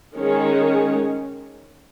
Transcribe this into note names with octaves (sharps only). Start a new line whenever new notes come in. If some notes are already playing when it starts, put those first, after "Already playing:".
D#3 G#3 C#4 G#4 C#5